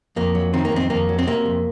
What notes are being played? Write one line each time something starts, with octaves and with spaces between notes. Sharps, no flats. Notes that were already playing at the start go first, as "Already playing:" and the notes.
F2 A#3
F#3
D#3 C4
A#3
F2 C4
F2 A#3
F#3
C4
C3 A#3
F2